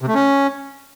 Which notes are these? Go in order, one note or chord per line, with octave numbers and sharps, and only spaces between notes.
C3
A3
C#4